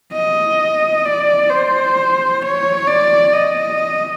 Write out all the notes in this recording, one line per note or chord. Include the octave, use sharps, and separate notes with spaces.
D#5
D5
C5
C#5
D5
D#5